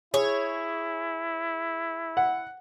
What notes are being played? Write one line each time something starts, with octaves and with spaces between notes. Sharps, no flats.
E4 G#4 C#5
F#5